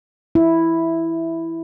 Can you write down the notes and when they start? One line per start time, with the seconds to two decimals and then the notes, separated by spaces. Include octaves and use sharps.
0.35 E4